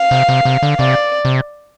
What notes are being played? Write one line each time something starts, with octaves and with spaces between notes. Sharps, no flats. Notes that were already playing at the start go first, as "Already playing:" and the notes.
Already playing: F5
C3
C3
C3
D3
C3 D5
C3